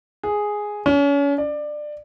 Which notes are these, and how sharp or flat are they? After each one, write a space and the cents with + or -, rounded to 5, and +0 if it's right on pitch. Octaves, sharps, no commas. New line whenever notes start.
G#4 +0
C#4 +35
D5 +20